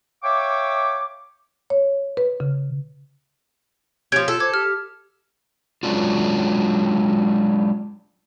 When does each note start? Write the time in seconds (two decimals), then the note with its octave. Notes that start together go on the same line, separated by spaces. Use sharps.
0.23 C#5 E5 F5 G5 C#6 D6
1.70 C#5
2.17 B4
2.40 C#3
4.12 F3 C#4 G4 G6 G#6 D7
4.28 F4 A4
4.40 C5 D6 G#6
4.54 G4 F6
5.83 F#3 G#3 C#4 D4 F4